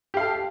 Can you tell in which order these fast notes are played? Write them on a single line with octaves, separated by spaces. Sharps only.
G4 F5 A4